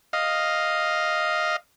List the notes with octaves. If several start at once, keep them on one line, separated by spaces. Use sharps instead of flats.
D#5 F5